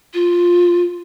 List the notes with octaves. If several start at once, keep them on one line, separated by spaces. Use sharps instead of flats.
F4